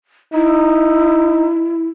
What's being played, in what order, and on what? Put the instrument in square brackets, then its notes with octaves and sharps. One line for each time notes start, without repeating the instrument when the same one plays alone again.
[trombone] D#4 [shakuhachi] E4